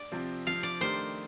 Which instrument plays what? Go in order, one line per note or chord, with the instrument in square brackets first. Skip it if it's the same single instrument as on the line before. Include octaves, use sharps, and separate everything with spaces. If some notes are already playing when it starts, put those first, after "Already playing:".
Already playing: [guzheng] D5
[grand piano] C3 F3 C4
[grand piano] C3 F3 C4 [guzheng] F5
[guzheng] D5
[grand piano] D#3 A3 D4 G4 A#4 [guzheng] C5